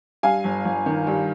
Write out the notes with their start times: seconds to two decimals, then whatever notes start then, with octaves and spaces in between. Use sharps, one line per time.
0.23 G2 F5 G#5
0.44 G1
0.65 G1
0.86 D#3
1.07 G2